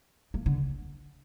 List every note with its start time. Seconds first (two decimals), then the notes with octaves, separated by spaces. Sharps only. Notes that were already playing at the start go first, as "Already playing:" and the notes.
0.34 A#3
0.46 D3